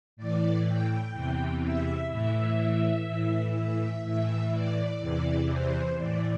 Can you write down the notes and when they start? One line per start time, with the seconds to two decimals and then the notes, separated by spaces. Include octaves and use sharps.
0.16 A2 E3 D5
0.65 G5
1.13 E2 C3 E3
1.62 E5
2.10 A2 E3 E5
3.07 A2 E3
3.55 E5
4.04 A2 E3 E5
4.52 D5
5.00 E2 C3 E3 D5
5.49 C5
5.97 A2 E3 D5